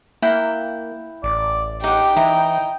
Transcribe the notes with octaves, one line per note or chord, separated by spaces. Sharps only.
A#3 E4 F#5 G5
A1 D5
D#4 G4 F#5 G5
E3 D#4 E4 A#5